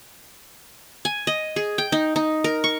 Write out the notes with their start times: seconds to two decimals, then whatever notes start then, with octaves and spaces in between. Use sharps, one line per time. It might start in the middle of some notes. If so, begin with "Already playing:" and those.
1.05 G#5
1.27 D#5
1.56 G#4
1.78 G5
1.92 D#4
2.16 D#4
2.44 A#4
2.64 C#6